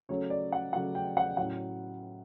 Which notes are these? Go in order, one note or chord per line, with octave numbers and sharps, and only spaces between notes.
C#3 F#3 A3 C#4 C#5
D5
F#5
C#3 F#3 A3 C#4 F#5
G5
F#5
A2 F#3 C#4 F#5